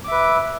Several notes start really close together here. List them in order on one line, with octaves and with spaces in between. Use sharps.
D6 E5 B4